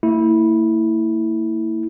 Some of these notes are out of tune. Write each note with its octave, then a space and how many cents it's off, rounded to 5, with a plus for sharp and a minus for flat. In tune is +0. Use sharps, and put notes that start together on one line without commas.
A#3 -45 E4 -15